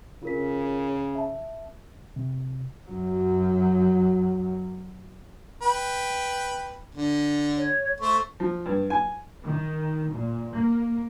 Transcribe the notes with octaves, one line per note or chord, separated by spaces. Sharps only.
C#3 F4 A#4 B6
E5 A5
C3
F#2 F#3
B4 G5
D3
C#5
A3 C5 C#6
F3
G2
G#5
D#3
A#2
A#3